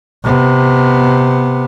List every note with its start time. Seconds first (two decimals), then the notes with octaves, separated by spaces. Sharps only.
0.24 C3 B3